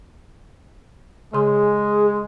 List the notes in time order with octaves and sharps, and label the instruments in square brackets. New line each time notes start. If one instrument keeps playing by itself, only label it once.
[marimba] C#3 C6 [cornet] G#3 [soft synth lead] G#4